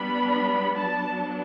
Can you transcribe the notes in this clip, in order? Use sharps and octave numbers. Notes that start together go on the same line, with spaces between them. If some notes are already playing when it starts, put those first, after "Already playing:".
Already playing: G3 B3 D4 B5
F#3 B3 D4 A5